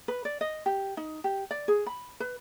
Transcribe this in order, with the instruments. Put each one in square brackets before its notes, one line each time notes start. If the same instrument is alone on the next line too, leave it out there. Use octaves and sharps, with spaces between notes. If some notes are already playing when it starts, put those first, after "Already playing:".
[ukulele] B4
D5
D#5
G4
D#4
G4
D5
G#4
B5
B4